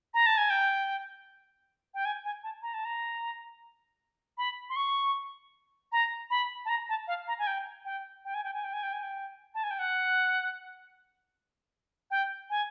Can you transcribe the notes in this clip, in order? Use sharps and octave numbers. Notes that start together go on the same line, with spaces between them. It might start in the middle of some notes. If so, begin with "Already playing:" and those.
A#5
A5
G#5
G5
G5
G#5
G#5
A5
A#5
A5
A#5
B5
C6
C#6
A#5
B5
A5
A#5
A5
F5
A#5
G#5
G5
G5
G5
G#5
G5
G#5
G5
G#5
G5
G#5
G5
A5
G#5
G5
F#5
G5
G#5